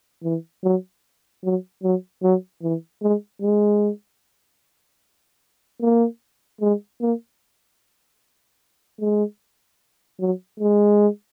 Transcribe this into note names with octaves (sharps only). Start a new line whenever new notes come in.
E3
F#3
F#3
F#3
F#3
E3
G#3
G#3
A#3
G#3
A#3
G#3
F#3
G#3